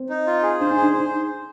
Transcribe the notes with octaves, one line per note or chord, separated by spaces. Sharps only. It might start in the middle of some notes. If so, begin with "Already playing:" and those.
Already playing: C4
D#4
F4
G#4
D4 C5
D#4
G#4
D4
D#4 C5